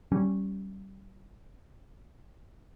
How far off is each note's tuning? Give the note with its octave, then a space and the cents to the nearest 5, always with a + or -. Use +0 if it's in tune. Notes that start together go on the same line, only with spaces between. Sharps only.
G3 -25 C#4 -20